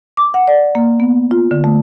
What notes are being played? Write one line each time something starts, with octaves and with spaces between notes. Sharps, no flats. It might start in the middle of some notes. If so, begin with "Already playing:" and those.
D6
F#5
D5
A#3
B3
F4
D3
A3